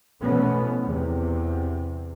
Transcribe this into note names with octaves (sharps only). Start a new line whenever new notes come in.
B2 E3 F3 A3 B3 C#4
E2 C3